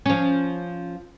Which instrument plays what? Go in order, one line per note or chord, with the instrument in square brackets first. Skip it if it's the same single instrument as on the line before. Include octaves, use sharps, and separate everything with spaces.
[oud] F3 C#4